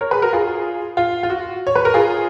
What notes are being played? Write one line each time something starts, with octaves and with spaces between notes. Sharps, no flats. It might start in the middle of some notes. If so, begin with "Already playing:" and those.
A#4 C#5
G#4 B4
F#4 A#4
F4 G#4
F4
F4
F#4
C#5
B4
A#4
F4 G#4